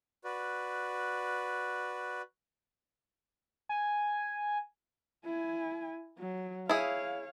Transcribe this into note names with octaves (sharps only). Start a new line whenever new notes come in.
F#4 B4 D5
G#5
E4 G#5
F#3
E4 G#4 C#5 F5